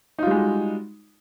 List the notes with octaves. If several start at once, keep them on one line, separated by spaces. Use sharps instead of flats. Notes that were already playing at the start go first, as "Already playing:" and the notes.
G3 G#3 D#4 F4 F#4